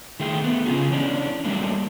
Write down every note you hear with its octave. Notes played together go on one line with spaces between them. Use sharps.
D#3 A3 G#4 G5
A3 B3
C#3 C#4 F4 G#4
E3 C#4 D4
F#3 G3 A3 A#3 D4